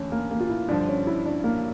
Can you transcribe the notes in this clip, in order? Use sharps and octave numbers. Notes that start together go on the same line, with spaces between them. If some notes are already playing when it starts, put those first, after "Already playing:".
Already playing: E2 D3 A3 C#4
A#3
A#3
F4
E4
G2 D3 F3 D4
C#4
E4
D4
A#3